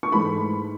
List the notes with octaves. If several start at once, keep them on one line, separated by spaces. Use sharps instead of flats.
C#6
G#2 E3 A3 B5